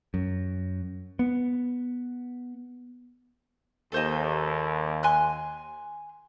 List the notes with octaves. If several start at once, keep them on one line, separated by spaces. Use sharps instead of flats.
F#2
B3
D#2 A4 C5 D#5
G#5 C6 F#6